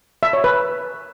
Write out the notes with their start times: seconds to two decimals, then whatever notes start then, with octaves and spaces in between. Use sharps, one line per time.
0.23 E5
0.33 C#5
0.44 B4